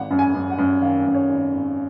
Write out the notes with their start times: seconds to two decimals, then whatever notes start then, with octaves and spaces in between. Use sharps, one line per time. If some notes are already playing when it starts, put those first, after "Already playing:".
Already playing: G#1 F#5
0.10 F#2
0.19 G#5
0.34 F#2
0.50 F#5
0.58 F#2
0.82 D#3 F5
1.06 F#2
1.14 C#5
1.29 G#1
1.53 G#1